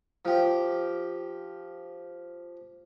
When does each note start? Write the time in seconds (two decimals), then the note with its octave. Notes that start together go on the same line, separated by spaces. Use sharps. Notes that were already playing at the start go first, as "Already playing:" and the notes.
0.25 F3 G4